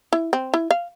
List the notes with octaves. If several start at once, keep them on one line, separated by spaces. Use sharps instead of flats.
E4
C4
E4
F5